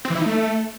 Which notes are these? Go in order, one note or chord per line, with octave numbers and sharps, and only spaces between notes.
C4
E3
E4
D#4
A3